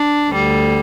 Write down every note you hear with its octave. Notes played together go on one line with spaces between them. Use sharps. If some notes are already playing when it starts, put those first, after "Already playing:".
Already playing: D4
D2 D3 G3